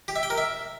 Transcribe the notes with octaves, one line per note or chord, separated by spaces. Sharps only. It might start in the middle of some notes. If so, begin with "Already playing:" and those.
G4
E5
G5
A#4
E5